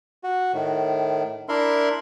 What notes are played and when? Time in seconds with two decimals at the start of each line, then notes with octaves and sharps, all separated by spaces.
0.24 F#4
0.53 A2 D#3
1.49 D4 E4 A#4 E5 B5 C6